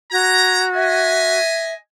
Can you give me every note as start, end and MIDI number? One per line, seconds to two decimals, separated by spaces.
0.12 1.39 66
0.12 0.66 82
0.12 0.64 92
0.74 1.78 75
0.74 1.73 76
0.74 1.78 80